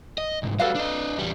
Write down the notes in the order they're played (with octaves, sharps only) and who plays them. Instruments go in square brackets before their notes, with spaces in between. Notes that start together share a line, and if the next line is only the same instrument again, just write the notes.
[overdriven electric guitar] D#5
C2 G#2
[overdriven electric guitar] G3 F#4 [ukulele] A4 B4 F5
[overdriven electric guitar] D4 D#5
E2 G3